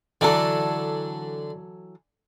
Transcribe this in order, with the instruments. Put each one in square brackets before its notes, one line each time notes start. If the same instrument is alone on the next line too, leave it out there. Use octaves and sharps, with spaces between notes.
[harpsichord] D3 D4 [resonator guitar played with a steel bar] E3 F#3 A4